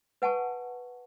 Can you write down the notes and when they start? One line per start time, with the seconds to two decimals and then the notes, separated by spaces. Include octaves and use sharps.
0.22 B4 F#5 G#5 A5 C#6